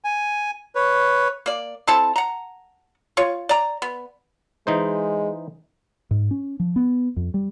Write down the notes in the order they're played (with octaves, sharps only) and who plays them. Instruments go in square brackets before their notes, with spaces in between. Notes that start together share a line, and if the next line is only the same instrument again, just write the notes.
[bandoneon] G#5
B4 C#5
[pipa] A#3 D5
C4 E4 A4 A5
F#5 A#5
F4 C#5
D5 A#5
B3
[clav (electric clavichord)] E3 D#4 C5 [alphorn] G#3
[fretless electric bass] G#2
C#4
F3
B3
F2
G3